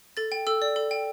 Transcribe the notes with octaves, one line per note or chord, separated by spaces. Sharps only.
A4 A6
G5
A4 E6
D5
A4
G5